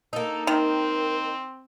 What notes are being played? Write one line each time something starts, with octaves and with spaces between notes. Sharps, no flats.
A#3 D#4 A4
D#3 C4 A#4